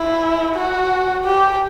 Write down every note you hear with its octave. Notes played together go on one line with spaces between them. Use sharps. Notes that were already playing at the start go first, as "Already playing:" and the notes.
Already playing: E4
F#4
G4